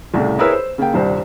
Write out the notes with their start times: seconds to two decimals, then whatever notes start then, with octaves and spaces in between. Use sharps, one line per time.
0.14 C2 A2 C#3
0.39 E4 G#4 A#4 B4 C#5 E6
0.51 C5
0.78 C#3 A#3 G5
0.94 D#1 C2 G2 C5